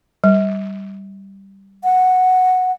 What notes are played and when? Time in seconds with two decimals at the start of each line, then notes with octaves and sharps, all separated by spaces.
0.24 G3
1.84 F#5